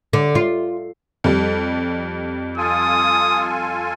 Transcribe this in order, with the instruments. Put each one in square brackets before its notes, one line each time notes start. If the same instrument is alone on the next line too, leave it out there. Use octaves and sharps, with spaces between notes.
[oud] D3
F4
[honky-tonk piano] F2 G3
[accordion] F4 A4 G#5 [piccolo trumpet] D#6